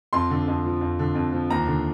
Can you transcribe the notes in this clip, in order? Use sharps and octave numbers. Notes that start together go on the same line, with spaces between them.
F2 C6
D3
F2
F3
F2
D3
F2
F3
D#2 A#5
D3